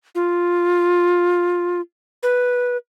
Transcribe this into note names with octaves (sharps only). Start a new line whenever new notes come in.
F4
B4